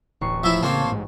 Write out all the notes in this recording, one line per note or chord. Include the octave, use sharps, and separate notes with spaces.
D1 A1 C#6 C7
F3 E4 E5
C#3 A#3 C4 C#5 A5 C6
G#2